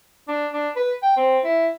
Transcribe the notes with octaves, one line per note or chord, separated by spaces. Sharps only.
D4
D4
B4
G5
C4
E4